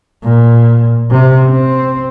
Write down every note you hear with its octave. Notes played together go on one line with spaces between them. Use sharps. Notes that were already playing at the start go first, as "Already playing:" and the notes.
A#2
C3
C4